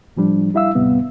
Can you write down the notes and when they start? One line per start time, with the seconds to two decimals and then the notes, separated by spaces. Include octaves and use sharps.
0.17 A2 F3 G3 D4
0.54 G3 E4 E5 F5 E6
0.75 D#2 A2 C3 G3 B3